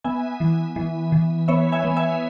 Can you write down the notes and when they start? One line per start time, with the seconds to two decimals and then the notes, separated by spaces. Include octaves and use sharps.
0.04 B3 E5 G#5
0.40 E3
0.76 E3
1.12 E3
1.48 B3 C#5 E5
1.72 E5 G#5
1.84 B3
1.97 E5 G#5